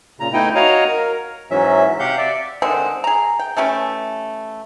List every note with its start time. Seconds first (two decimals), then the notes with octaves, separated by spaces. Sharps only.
0.20 A#2 C#3 A#5
0.33 A3 B3 D#4 E4 D#5 G5
0.55 F#4 C#5 D#5 F5 A#5
0.88 A#4
1.51 G#2 E3 F#3 C#4 E5
2.00 C3 G4 F5 F#5 G6
2.18 D5 E5
2.62 D3 D#3 G#3 C4
3.04 G#4 A#5
3.39 G5
3.57 E3 A3 C#4 G4